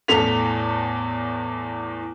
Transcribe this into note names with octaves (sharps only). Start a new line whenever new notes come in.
E2 A2 A4 B6 F7